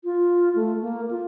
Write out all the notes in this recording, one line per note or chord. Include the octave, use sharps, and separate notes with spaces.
F4
A3
A#3
F4